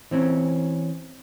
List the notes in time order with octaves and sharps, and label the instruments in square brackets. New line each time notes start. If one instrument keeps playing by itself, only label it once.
[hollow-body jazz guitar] E3 C4 C#4